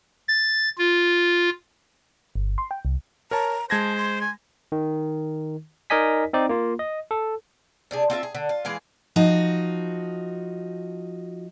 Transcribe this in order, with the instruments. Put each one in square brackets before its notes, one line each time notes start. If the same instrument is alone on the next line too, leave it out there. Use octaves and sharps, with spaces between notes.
[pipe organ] A6
F4
[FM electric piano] G1
C6
G5
C2
[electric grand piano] A#4 C#5 A5 [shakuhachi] A#5
[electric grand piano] G#3 G#6 A#6 [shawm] C5 [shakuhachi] A5
[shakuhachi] C6
[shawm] G#5
[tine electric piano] D#3
D#4 A#4 D5 D#5 G#5 B6
C4 D#4 D5
A#3 F4
D#5
A4
[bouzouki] C3 D4 G#4
C4 F4 A4 E5
G#4
D3
F4
E3 G#3 G#4 F5
[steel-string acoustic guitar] F3 D#4 F#4